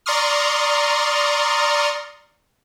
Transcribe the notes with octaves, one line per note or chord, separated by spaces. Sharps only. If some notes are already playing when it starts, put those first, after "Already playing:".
D5 A#5 C6 C#6 D#6 F6